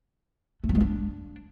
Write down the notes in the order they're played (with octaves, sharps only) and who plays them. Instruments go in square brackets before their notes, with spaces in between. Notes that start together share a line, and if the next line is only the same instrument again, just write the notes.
[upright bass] A3
F#3
G#3
D4